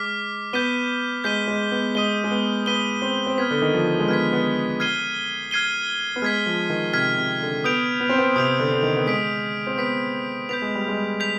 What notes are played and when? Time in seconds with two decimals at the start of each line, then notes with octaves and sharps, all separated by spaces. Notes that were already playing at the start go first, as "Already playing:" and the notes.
Already playing: G#3 D6 F6 B6
0.53 B3 G6 B6 D#7 G7
1.24 G#3 G6 B6 D#7 G7
1.47 G#3
1.71 B3
1.95 G#3 D#6 B6 D#7 G7
2.24 G#3
2.31 B3
2.66 B3 D#6 B6 D#7 G7
3.02 C4
3.27 C4
3.38 B3 F6 G#6 B6
3.51 D3
3.62 D#3
3.74 F3
3.99 G#3
4.08 B3 F6 G#6 B6
4.33 B3
4.80 F6 G#6 C7 D#7 G7
5.51 F6 G#6 C7 D#7 G7
6.16 B3
6.22 G#3 F6 G#6 B6
6.46 F3
6.70 D#3
6.93 C3 F6 G#6 B6
7.17 C3
7.41 D3
7.64 B3 D#6 G6 D7 F7
8.00 B3
8.09 C4
8.18 B3
8.36 C3 D#6 G6 D7 F7
8.59 D3
8.71 D3
8.83 D#3
8.96 B3
9.06 G#3 D#6 B6 D7
9.67 C4
9.78 B3 D#6 B6 D7
10.49 B3 G6 B6 F7
10.62 G#3
10.75 G3
10.88 G#3
11.20 G6 B6 F7